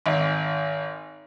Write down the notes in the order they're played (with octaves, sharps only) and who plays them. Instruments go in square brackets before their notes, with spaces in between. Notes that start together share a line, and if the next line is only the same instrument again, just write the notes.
[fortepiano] G#1